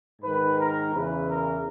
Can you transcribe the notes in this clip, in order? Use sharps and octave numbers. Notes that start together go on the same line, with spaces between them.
G#2 D#3 B4
A#4
E2 C#3 E3 B4
A#4